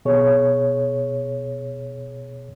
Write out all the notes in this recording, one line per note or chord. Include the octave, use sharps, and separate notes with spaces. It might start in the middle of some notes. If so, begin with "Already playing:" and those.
B2 G#4 C#5